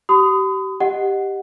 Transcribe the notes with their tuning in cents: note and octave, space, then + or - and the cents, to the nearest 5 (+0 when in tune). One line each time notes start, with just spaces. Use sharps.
G4 -35 B5 +40 D#6 +0
G4 +0 D#5 -5 F#5 +0